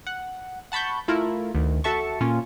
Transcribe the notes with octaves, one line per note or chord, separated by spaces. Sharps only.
F#5
F#5 A5 B5 C#6 G6
A3 E4 F4 A#4
D2 D#3
F#4 A4 E5 A5 C#6
A#2 A#3 C#4 F4